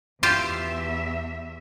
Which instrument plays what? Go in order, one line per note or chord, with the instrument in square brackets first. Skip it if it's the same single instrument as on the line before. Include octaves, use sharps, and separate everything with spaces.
[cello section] E2 E5 [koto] F4 G4 C5